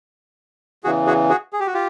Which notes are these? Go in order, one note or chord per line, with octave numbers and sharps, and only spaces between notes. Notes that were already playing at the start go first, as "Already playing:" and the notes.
E2 C#3 E3 F#4 G#4
F#4 G#4
F#4 G#4
G#4
G4
F#4
F4 G4